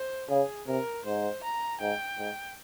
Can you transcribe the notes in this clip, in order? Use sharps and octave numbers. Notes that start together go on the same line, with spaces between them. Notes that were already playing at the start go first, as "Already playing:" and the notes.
Already playing: C5
C#3 G#4
C3 A#4
G#2 C5
A#5
G#2 G5
G#2